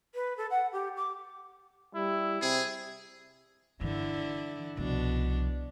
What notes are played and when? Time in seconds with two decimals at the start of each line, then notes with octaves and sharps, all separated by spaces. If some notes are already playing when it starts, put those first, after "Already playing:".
0.14 B4
0.37 A4
0.51 F#5
0.72 G4
0.97 D6
1.95 G3 E4
2.42 C3 G#4
3.81 G2 D3 E3 E4
4.77 C2 B2 F3 D4